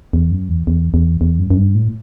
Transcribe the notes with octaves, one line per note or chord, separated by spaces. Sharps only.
E2
F#2
E2
E2
E2
E2
F#2
F#2
G2
A2